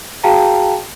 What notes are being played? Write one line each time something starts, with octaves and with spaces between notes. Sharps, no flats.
F#4 G#4 F5 G5 A5 A#5